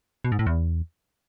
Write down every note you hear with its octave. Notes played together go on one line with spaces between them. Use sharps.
B2
G#2
A2
E2